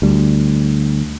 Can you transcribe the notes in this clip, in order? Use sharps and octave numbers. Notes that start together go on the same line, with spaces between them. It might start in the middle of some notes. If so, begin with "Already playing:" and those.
D2 G3